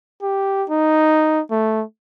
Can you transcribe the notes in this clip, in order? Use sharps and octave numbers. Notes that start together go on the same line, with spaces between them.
G4
D#4
A3